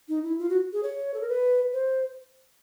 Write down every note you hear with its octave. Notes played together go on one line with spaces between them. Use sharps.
D#4
E4
F4
F#4
G#4
C#5
A4
A#4
B4
C5